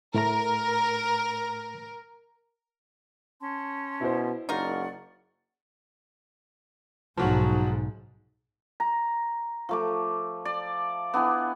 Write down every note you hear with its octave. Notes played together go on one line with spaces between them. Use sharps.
A2 A3 A#4 A#5
C#4 A5 C6
B2 E4 C5
F#1 D#4 F4 A#4 D5 F#5 C#6
B1 G#2 F3 F#3 F#4
A#5
F3 A3 D6
D5
B3 D4 E4 G#5